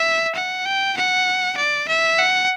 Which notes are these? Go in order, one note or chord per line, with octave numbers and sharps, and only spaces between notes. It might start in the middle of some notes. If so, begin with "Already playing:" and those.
Already playing: E5
F#5
G5
F#5
D5
E5
F#5